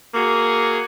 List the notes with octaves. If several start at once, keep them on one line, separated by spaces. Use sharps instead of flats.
A#3 F#4 G#4